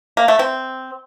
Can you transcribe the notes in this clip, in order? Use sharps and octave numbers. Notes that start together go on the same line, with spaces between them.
A#3
A3
C4